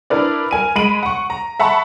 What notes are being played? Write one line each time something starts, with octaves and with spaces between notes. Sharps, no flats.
D4 E4 A#4 B4 D5
A#4 G#5 D#7
G#3 B5 D7 D#7 F#7
F#5 C#6
A#5
E5 F#5 A5 B5 C#6